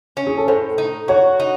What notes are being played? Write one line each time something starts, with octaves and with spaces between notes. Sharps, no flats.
C#4
G#4
A4
A2 C5
D#4
F#4 C#5
D#4